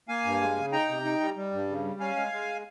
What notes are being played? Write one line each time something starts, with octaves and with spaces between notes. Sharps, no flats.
A#3 F5 G#5
G2
G#3
C#3
D#4 G5 A#5
C3
D#4
G3
G3
G2
C#3
G3
C#4 F5 G#5
G#3
G#3